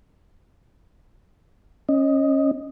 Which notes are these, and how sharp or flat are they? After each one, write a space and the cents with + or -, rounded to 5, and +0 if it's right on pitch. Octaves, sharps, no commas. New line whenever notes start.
C#4 -20 D#5 +0